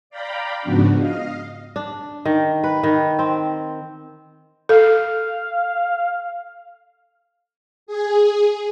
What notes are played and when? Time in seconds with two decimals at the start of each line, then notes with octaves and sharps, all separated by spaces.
0.10 D5 F5 G5 A#5 B5
0.62 G#2 C#3 F3 B3 D4 F#4
0.99 D#5 F5
1.76 D4
2.25 D#3
2.64 B4
2.83 D#3
3.19 C4
4.69 A4 F5
7.87 G#4